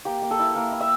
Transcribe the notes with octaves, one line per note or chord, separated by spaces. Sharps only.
A#3 G4
A#3
A4
E4
A#3 A#4
E4
E5